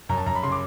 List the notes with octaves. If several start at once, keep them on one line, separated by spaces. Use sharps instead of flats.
F#2 A#5
A5
F#2 A#5
B5
C#3 C6
D6